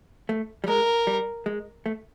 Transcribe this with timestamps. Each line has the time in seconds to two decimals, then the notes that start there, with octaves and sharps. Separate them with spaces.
0.29 A3
0.64 G3
0.68 G#3 A#4
1.07 G3
1.46 G#3
1.86 A3